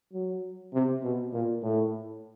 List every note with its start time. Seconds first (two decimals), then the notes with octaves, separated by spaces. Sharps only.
0.13 F#3
0.73 C3
1.03 B2
1.33 A#2
1.63 A2